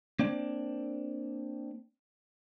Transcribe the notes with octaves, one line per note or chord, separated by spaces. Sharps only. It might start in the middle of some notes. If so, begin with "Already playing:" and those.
A#3 C4 D4